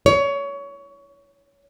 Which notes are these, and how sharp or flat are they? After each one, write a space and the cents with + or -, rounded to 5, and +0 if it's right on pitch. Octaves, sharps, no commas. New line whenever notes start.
C#5 +20